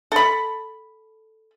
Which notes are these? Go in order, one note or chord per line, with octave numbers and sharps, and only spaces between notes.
A4 B5